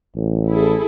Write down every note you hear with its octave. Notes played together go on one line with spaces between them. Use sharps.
A1
E4 G#4 A4